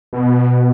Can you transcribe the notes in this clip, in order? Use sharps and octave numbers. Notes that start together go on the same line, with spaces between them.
B2